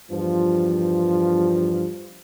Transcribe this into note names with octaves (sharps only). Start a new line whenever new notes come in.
E2 G2 F3